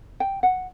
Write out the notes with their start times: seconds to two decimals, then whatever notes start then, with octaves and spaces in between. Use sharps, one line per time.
0.20 G5
0.43 F#5